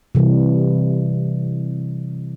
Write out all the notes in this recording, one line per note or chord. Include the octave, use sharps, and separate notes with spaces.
C3 E3 G3